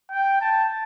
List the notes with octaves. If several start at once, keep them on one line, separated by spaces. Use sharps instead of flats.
G5
A5